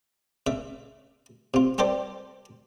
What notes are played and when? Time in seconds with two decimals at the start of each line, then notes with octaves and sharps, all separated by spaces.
0.47 C#3 E5
1.54 C3 F4
1.78 G3 G4 A4 C5 D5